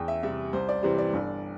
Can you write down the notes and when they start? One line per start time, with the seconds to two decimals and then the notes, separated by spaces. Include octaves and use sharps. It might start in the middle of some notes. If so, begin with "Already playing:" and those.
Already playing: E2 G5
0.08 E5
0.23 C3 G3 E5
0.53 C2 C5
0.69 D5
0.83 C3 E3 G3 C5
0.98 D5
1.13 G1